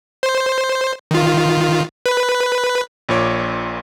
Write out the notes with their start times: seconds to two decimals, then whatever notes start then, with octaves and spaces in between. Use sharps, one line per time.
0.23 C5
1.11 D#3 F4
2.06 B4
3.09 A#1 A#2 C#5 D6